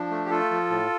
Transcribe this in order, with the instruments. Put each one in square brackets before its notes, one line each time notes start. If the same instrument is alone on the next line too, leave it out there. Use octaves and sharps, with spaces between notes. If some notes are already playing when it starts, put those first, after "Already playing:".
Already playing: [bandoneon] F3 D4
A3
G4
A3 F4 A4
F3
A2